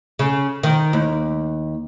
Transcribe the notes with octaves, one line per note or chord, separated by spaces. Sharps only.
C#3
D#3
D#2